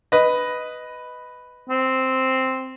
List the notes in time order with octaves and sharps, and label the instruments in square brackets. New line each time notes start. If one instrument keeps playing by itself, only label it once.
[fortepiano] B4 D#5
[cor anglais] C4